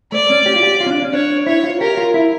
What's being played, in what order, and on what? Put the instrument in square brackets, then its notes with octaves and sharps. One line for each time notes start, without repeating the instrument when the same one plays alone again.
[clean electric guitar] A3 [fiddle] D5
[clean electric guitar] C#4
G4
F4
G4
F4
C#4
D4
C#4
[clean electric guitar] D4 [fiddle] C#5
[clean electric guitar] E4 [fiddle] C#5
[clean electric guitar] F4
[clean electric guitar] G4 [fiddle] A#4
[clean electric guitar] F4
E4